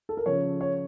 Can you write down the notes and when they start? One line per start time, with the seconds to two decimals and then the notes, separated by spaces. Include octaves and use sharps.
0.09 A4
0.17 A#4
0.26 C#3 F3 C#5
0.61 C#5